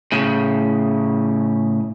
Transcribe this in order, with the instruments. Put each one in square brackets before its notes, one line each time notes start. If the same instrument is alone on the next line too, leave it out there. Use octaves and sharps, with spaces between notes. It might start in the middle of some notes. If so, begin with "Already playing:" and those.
[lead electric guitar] A2 C#3